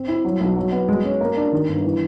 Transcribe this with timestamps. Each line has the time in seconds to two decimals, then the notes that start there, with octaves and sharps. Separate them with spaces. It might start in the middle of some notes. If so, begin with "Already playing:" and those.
Already playing: C4
0.08 E4
0.25 F#3
0.41 B1
0.56 F#3
0.72 B3
0.89 G#3
1.05 C#4
1.21 A#3
1.37 D4
1.52 D#3
1.69 G1
1.84 E3